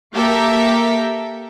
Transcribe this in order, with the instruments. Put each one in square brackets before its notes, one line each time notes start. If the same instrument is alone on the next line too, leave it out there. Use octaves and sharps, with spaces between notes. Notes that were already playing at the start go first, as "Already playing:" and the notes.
[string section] A#3 G4 A4 A#4 E5 A#5